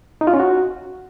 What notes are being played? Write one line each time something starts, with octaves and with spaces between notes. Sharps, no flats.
D#4
F4
C#4
F#4